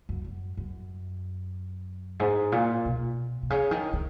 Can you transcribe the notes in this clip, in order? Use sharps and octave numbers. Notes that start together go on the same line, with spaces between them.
F#2
F#2
F#2
G#2
A#2
B2
B2
C#3
D#3
D#3